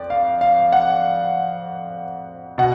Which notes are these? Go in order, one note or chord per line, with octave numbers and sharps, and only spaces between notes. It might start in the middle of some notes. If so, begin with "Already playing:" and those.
Already playing: F2 D5
F5
F5
F#5
B2 F#5